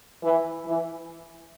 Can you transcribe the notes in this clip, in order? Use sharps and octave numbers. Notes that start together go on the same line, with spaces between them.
E3
E3